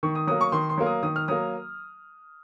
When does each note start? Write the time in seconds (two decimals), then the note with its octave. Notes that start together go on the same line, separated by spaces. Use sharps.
0.03 D#3 C#6
0.15 D#6
0.27 F#3 A#3 D#6
0.41 C#6
0.52 D#3 C6
0.69 C6
0.78 F#3 A#3
0.86 D#6
1.03 D#3 D#6
1.16 F6
1.28 F#3 A#3 D#6